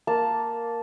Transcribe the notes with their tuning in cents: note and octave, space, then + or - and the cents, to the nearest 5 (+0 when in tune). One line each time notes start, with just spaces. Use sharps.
A#3 +0 A5 +0